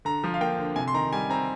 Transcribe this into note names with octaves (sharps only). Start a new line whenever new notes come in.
D3 A#5
F3
F5
A#3 G5
D3
C3 G#5
C6
D#3 A#5
G3 G#5
C4 A#5